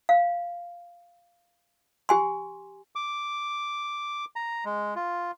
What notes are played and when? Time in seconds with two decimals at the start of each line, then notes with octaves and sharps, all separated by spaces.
0.09 F5
2.09 G4 G#5 C6
2.95 D6
4.36 A#5
4.65 G#3
4.96 F4